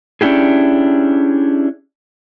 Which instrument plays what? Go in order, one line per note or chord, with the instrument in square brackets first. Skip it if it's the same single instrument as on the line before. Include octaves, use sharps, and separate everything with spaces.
[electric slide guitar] C#4 D4 E4 G4 G#4